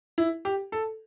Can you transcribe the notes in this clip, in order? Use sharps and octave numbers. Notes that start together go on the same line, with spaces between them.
E4
G4
A4